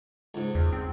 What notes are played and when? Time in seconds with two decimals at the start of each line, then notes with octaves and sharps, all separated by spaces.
0.34 C#2 G#2
0.55 E2
0.73 C4